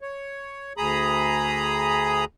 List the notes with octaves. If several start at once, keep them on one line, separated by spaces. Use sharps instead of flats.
C#5
D2 G#4 A#5 B5 D#6